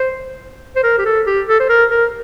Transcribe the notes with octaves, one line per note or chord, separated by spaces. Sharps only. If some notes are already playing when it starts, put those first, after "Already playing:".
Already playing: C5
C5
A#4
G4
A4
G4
A4
C5
A#4
A#4